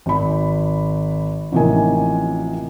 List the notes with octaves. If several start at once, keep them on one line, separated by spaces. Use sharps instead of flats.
G#1 B5
A1 C3 F3 A#3 D#4 G#5